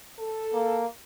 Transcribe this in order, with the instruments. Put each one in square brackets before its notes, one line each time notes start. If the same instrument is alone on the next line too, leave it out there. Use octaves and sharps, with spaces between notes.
[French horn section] A4
[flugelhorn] A#3